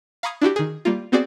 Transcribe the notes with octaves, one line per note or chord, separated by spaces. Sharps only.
F5 A#5 B5 C#6 D#6 G#6
D4 E4 F#4 G4
D#3 G#4
G3 A#3 F4
B3 C4 F#4 G#4 D5